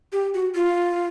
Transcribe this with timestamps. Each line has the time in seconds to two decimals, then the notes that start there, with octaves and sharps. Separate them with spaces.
0.13 G4
0.34 F#4
0.55 F4